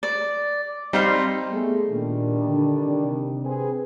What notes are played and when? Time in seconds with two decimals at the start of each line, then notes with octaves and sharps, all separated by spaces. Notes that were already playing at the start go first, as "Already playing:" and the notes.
0.03 D5
0.93 G3 C4 D#4 F5 C6
1.50 A3 B3 G#4
1.90 A#2 D#3 G3 D4
2.47 D3
2.86 C3
3.44 C4 G#4 B4